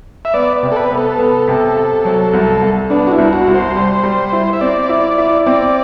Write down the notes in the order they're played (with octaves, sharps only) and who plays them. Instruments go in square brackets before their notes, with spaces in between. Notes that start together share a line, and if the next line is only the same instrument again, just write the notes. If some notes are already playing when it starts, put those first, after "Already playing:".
[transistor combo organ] E5
[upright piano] B3 [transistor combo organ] D5
[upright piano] C3
[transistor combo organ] A4
B4
[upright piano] B3
[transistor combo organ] A4
[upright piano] B3
C3
C3
F#3
C2
C2
[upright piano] B3 [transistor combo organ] D4
[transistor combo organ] F#4
E4
[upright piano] C2
[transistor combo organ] F#4
[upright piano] C2
[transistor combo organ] C5
[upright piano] G3
G3
E4
[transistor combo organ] E5
[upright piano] C4 [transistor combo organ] D5
[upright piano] E4
E4
[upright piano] C4 [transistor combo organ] D5